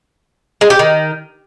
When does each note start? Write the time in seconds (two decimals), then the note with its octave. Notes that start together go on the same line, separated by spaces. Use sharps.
0.61 G#3
0.70 G4
0.79 D#3